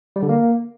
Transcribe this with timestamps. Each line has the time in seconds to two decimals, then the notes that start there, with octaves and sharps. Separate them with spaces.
0.16 G3
0.23 D3
0.29 A#3